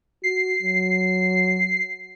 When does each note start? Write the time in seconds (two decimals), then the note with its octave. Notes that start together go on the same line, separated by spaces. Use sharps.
0.24 F#4 C7
0.62 F#3